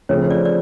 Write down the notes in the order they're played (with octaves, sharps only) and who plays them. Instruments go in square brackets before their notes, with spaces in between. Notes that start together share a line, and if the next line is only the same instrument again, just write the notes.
[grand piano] C#3 F3 A3 C4 [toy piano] C#5
[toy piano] D5
D5